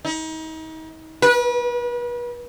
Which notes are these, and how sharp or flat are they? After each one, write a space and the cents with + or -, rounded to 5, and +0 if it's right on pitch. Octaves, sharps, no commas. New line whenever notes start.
D#4 +35
B4 -35